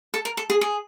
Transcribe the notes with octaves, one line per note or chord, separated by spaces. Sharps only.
A4
A#4
A4
G#4
G#4